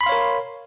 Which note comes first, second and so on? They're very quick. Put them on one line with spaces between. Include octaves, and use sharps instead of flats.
B5 C6 F5 C#5 A#4